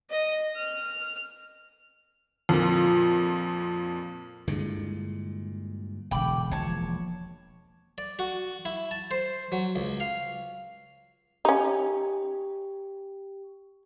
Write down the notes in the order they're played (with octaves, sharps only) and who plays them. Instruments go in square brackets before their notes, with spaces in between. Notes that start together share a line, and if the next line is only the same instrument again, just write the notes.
[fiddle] D#5
F6
[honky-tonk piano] F2 A#2
[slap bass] G2 A#2 G#3 [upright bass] D3 E4
[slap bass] E1 [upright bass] B2 D3 [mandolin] G5 B5 D6
[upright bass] F3 A#3 [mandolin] C#5 A5
[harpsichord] D5
F#4
E4
A5
C5
F#3
C#2
F5
[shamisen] C#4 D#4 [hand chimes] G4